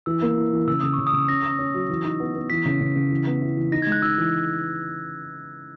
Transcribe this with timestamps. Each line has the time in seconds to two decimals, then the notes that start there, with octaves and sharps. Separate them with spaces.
0.06 E3 E6
0.22 A#3
0.37 E4
0.53 E3
0.67 C#3 E6
0.81 C#3 D#6
0.93 C#3 C#6
1.07 D#6
1.13 C#3
1.28 C#4 A#6
1.44 C#4
1.59 C#4
1.74 F#3
1.90 E3
2.04 D#4
2.20 B3
2.35 B3
2.50 E3 B6
2.66 C#3
2.80 C#3
2.96 C#3
3.11 E3
3.26 B3
3.41 E4
3.57 E3
3.72 D#4 A#6
3.82 G#6
3.87 G#3
3.92 F#6
4.02 D#4 E6
4.18 E3